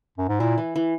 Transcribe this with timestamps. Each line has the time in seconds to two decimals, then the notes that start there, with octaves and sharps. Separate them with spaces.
0.18 F#2
0.28 G#2
0.40 A#2 E4
0.58 E3
0.76 E3